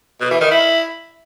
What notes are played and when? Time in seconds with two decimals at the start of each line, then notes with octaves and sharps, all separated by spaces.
0.21 B2
0.31 E3
0.41 D#3
0.51 E4